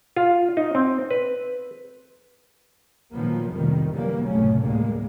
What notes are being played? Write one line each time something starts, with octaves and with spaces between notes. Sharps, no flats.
F4
D#4
C4
B4
A#2 D#3 F3 F#3 A#3 B3
F2 A2 C3 D#3 G3
B2 D3 E3 F#3 G3 A#3
F#1 A2 C3 A3 C#4
D2 A2 G3 G#3 A#3